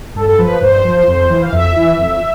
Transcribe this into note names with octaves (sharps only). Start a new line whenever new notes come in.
G2 A4
A4
F3 B4
G2 C5
F3
F2
E3
F5
F2 E5
E3
F2